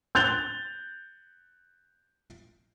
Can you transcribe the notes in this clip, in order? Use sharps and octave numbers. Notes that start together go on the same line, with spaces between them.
F#6 G6 A6 F7 G7